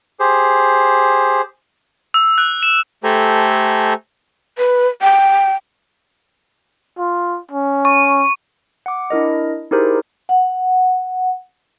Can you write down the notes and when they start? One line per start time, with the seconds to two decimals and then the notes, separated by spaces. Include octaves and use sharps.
0.20 G4 G#4 C5
2.14 E6
2.38 F#6
2.63 E7
3.04 A3 G4 A4 C5 G#5 A#5
4.58 B4
5.02 G5
6.98 F4
7.51 C#4
7.85 C#6
8.86 F#5 D6
9.10 D4 E4 A#4 D#5
9.71 D#4 E4 G4 G#4 A#4 C5
10.29 F#5